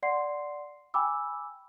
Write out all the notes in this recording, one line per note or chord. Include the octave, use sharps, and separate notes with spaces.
D5 F#5 C6 C7
G5 G#5 B5 D6 E6